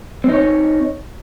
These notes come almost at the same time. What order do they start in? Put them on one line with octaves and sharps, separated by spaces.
C4 D#4 C#5